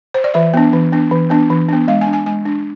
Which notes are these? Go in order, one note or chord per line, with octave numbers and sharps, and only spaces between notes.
C5
D5
E3 E5
B3 D4
E3
B3 D4
E3
B3 D4
E3
B3 D4
G#3 F5
G#5
D4
G#5
G#3 G#5
D4